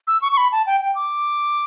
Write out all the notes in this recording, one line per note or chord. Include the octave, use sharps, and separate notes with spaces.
E6
C#6
C#6
B5
A5
G5
G5
D6